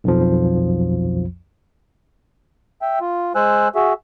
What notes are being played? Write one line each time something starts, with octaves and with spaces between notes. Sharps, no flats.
B1 F2 F3
E5 G5
F4
G#3 C5 G#5 E6 F#6
F#4 G#4 E5